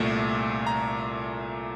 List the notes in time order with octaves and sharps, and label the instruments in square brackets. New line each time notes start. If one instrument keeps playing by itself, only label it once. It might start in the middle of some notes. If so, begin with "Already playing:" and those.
Already playing: [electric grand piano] C2 A#2 A3
A#5